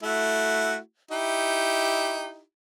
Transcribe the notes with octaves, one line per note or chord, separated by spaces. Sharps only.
A3 E4 F#4
D#4 E4 G4